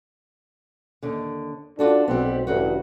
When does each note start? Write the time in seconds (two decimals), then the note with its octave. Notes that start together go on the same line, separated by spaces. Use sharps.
1.02 D#2 D3
1.79 D4 F4 F#4 A4
2.08 B1 G3 B3 C4
2.47 A1 G2 C#3 G3 F#4